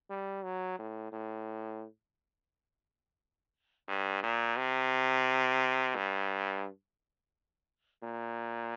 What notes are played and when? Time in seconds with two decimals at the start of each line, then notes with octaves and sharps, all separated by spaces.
0.10 G3
0.43 F#3
0.79 A2
1.12 A2
3.89 G2
4.23 A#2
4.58 C3
5.96 G2
8.03 A#2